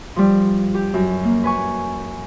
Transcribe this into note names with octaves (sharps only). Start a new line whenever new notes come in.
F3 G3
G4
F#2
A#3
B4 G#5 C#6